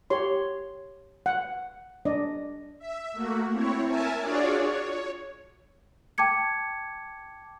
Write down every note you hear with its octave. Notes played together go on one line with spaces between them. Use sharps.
G4 C#5 C6
F#5
D4 D5 D#5
E5
A3 A#3 F#4
C4 E4 C#5
A#4 E5 G#5 A5
D4 F4 F#4 G#4 C#5 D5
C#5
G5 A5 D6 G#6 C#7